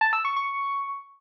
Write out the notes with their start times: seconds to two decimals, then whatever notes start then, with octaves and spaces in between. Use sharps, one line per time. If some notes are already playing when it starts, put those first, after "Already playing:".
0.01 A5
0.13 E6
0.25 C#6
0.36 C#6